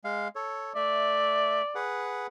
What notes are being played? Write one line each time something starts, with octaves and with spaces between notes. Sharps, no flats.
G#3 F5
A4 C#5
A3 D5 E5
G#4 B4 F#5